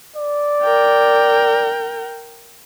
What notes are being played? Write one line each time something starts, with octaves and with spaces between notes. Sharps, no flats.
D5
A#4 G5